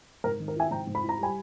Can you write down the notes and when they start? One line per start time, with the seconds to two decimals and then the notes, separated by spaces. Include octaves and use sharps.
0.24 G#2 A#4
0.40 D#3
0.48 A#4
0.56 E4 E5 G#5
0.71 G#2 G5 A#5
0.87 G#2
0.95 B5
1.03 E4
1.09 A#5
1.19 G3 G#5 B5